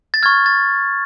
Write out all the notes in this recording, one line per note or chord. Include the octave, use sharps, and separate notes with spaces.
A6
C#6 F6 G#6
A6